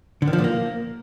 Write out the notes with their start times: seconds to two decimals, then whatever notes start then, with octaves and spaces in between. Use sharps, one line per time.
0.22 D3
0.27 D#3
0.33 F3
0.38 A#2
0.44 A#3